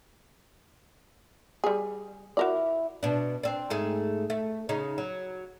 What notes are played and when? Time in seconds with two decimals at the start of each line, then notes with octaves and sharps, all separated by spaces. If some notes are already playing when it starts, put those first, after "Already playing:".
1.64 G3 G#4
2.37 E4 F#4 A#4 D5
3.03 B2 D4
3.43 C4 D4
3.70 G#2 A3 G#4
4.30 A3
4.69 C#3 D#4
4.98 F#3